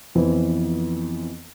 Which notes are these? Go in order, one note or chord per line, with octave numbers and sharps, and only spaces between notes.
F2 E3 F3 B3 C4